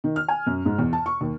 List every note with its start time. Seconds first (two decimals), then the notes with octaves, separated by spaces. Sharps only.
0.04 D#3
0.16 F6
0.28 G#5
0.47 F#2
0.65 G#2
0.79 E2
0.93 A5
1.06 C#6
1.21 D#2